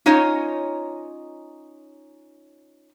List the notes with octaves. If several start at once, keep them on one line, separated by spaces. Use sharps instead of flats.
C#4 D#4 F4 C#5 D#5